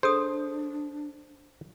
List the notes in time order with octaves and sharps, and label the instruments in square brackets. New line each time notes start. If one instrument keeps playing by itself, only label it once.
[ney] D4 [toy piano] G#4 A4 D#6 [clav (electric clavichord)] C5